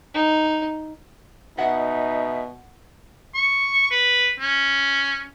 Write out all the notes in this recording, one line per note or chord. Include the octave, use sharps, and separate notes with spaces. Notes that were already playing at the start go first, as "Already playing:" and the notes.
D#4
B2 D#4 E5 F#5
C#6
B4
C#4